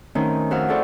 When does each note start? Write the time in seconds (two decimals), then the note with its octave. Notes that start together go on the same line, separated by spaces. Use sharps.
0.15 D#3 A3 C4 C#4 D#4
0.51 F2 F#4 E5 F5
0.69 E4 G#4 A4 C5 D5 C#6